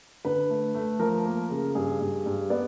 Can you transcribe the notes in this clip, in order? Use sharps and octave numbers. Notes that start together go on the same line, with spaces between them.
D3 B4
A3
A3
F3 A#4
A#3
C#3
G2 G#4
G2
G2
B3 D5